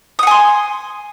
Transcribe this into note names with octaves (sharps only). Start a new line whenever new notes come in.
F#5 G#5 C6 D#6